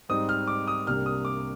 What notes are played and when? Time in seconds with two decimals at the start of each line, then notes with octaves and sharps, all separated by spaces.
0.09 G#2 G3 C4 D#4 D#6
0.29 F6
0.47 D6
0.67 D#6
0.86 C2 C3 G3 A#3 D4 F6
1.06 D#6
1.25 D6